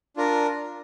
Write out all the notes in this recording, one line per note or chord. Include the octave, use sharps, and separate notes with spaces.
D4 F4 A#4